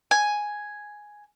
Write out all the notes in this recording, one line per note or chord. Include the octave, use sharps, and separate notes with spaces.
G#5